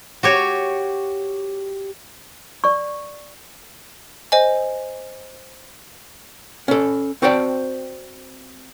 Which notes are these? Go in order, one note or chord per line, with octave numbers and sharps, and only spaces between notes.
F#4 G4 C#5
D5 C#6
C5 D#5 G#5
C#4 A4
C4 F#4 C5 D5 G5 A5